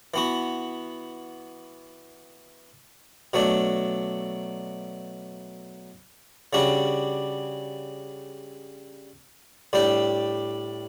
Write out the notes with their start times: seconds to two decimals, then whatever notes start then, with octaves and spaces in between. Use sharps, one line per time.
0.14 E3 B3 F#4
3.33 B2 F#3 A3 D4
6.53 C#3 G3 D4 F#4
9.73 A2 G3 D4 G4